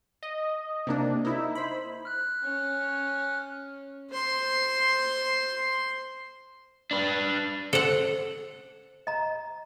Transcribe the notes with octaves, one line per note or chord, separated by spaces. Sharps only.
D#5
C3 A#3 D4
D#4 E4
C5 B5
F6 F#6
C#4
C5 C6
D4 B4
A4 C5 F#5
D#5 A#5